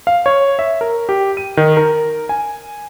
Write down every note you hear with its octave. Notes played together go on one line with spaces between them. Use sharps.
F5
C#5
E5
A#4
G4
D#7
D#3
A#4
G#5